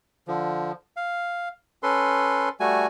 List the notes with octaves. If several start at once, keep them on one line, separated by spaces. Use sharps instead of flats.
D3 F3
F5
C#4 A4 B4 C6
G3 A3 F#4 G#5